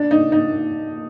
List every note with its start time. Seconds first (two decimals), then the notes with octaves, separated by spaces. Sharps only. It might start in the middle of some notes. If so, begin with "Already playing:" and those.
Already playing: D4
0.11 D#4
0.32 D#4